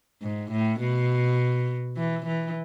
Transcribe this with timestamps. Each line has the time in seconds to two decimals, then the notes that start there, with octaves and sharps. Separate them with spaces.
0.22 G#2
0.52 A2
0.80 B2
1.97 E3
2.26 E3